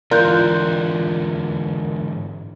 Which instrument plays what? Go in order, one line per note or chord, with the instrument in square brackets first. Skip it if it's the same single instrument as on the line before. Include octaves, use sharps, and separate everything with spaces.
[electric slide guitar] G#2 D3 E3 [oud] F4 [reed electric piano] A#4 [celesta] D5 F#6 G6